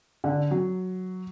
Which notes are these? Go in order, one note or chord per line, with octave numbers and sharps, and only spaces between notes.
D3
F#3